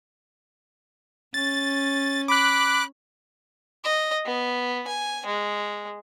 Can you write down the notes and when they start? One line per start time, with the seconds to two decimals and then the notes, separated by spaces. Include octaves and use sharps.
1.34 C#4 A6
2.28 B5 D6 F#6
3.84 D#5
4.25 B3
4.87 G#5
5.26 G#3